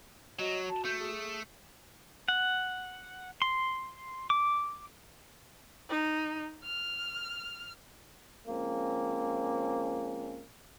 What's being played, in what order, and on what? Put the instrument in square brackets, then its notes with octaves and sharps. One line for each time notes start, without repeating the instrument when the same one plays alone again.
[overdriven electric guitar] F#3 [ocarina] F#4 [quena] D#5
[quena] A5
[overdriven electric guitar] A3 [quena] G6
[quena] G#4
[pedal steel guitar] F#5
C6
D6
[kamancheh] D#4
F6
[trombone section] F3 G#3 A#3 C4 C#4